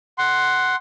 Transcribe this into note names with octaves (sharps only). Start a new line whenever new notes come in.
F#5 C6